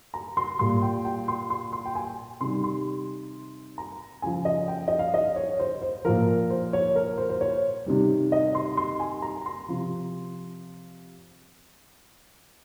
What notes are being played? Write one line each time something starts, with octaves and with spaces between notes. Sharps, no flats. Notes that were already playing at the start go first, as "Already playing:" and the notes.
A#5
C6
A#2 G3 C6
G5
G5
C6
C6
C6
G5
G#5
C3 D#3 G3 C6
C6
A#5
C#3 F3 G#5
D#5
G5
D#5
F5
D#5
C#5
C5
C5
A#2 F3 A#4
C5
C#5
A#4
C5
C5
C#5
C3 D#3 G3
D#5
C6
C6
G#5
A#5
C6
C3 F3